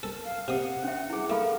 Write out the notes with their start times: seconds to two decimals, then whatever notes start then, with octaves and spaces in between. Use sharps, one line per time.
0.03 A4 A#4
0.24 F5
0.48 C3 F#5 D#6
0.84 C#4 E5
1.10 E4 G#4
1.30 A3 A4 A#4 F5 B5